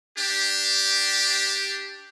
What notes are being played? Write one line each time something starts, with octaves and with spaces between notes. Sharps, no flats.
D4 G4